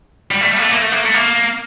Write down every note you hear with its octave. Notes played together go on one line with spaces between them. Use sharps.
G3
A3
G3
A#3
A3
A#3
A3
A#3
A3
A#3